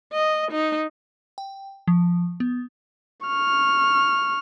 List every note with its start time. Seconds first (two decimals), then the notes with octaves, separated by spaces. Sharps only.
0.14 D#5
0.52 D#4
1.38 G5
1.88 F3
2.40 B3
3.27 C#6 F6